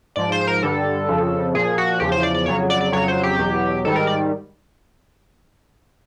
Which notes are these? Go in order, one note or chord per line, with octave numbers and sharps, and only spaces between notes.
G#2 F3 D5
C5
A#4
G2 D3 G3 A4
F2 C#3 F3
A#2 F3 G#4
F#4
E2 C#3 F3 G4
C5
D5
D5
F2 C#3 F#3 C#5
D5
D5
F2 C#3 F#3 C#5
C5
G4
E2 B2 F#3
G#2 D#3 G3 A4
A#4
D5